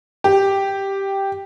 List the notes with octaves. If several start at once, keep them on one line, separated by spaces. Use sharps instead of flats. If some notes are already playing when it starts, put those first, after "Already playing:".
G4